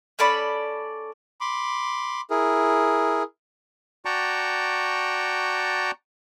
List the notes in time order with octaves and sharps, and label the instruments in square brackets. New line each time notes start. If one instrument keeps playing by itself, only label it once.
[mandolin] C#4 A4 D5 B5
[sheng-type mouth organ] B5 C6 D6
E4 G#4 A#4
[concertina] F#4 D5 G5 A5 A#5 C#6